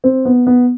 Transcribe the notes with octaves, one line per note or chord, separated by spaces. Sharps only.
C4
B3
B3